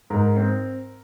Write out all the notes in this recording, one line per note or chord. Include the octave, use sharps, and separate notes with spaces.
G#2 A#4
C4